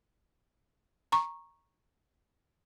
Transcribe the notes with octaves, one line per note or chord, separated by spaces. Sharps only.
A#5 C#6